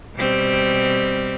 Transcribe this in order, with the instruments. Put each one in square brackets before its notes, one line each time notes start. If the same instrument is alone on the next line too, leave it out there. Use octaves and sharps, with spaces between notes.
[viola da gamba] B2 G3 C4